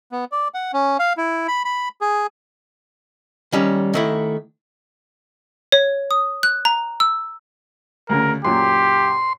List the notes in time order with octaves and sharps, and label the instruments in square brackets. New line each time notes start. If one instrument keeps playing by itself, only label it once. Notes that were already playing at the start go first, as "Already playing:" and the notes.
[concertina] B3
D5
F#5
C#4
F5
E4
B5
B5
G#4
[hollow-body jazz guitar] D#3 G3 C#4
D#3 A3 E4
[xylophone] C#5
D#6
F#6
A#5
E6
[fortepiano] D2 C#3 [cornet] A#4
[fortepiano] F#2 A#2 [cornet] G4 [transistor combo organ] C6